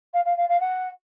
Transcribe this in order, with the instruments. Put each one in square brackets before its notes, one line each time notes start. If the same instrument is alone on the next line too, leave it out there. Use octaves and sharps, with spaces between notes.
[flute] F5
F5
F5
F5
F#5